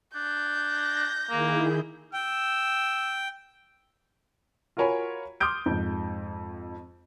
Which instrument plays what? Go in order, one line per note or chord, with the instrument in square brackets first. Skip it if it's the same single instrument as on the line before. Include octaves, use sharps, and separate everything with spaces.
[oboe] D4 [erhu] G6
[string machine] A#6
[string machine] D#3 E4 G#4 [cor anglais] A#3
[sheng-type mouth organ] G5 [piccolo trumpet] E6
[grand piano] F4 F#4 A#4 C#5 G#5 B5
C6 D6 D#6 F6 G6 D7
F2 G#2